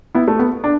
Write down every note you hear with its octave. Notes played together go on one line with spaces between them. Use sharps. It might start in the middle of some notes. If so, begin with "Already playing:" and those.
B3 E4
A3
B3
D4